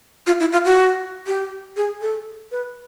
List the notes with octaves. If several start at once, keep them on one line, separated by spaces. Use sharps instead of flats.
F4
E4
F4
F#4
G4
G#4
A4
B4